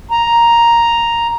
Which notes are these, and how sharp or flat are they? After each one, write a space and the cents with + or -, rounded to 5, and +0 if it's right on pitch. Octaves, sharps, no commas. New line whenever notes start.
A#5 +5